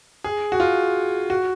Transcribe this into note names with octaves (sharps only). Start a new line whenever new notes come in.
G#4
F#4
F4
F#4